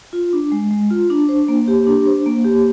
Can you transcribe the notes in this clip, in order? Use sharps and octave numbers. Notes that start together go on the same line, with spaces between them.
F4
D4
G#3
G#3
F4
D4
C5
A#3
G4
D4
C5
A#3
G4